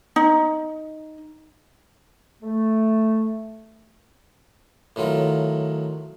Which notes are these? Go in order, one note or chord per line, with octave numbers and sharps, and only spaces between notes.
D#4
A3
A2 D#3 F#3 F4